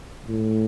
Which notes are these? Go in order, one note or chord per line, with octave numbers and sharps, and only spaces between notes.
A2